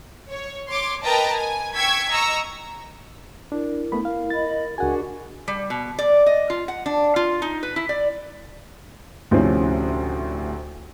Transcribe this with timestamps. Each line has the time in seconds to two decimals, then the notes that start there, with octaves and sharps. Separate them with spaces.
0.30 C#5
0.69 C#5 C6 D6
1.01 A#4 B4 D#5 G5 A5 A#5
1.34 G#5
1.73 G5 C#6 E6 G#6 B6
2.09 D#5 A#5 C#6 E6
3.52 D4 E4 A#4
3.92 A3 B3 B5
4.05 A#4 F5
4.30 D#5 B5 A6
4.78 C#2 D4 F#4 G#4 A#4 F#5 G#5
5.48 G3
5.70 B2
5.99 D5
6.26 D#5
6.50 F4
6.68 F#5
6.86 D4
7.16 F4
7.42 D#4
7.63 B4
7.76 E4
7.89 D5
9.31 D2 A2 C3 F3 C4 C#4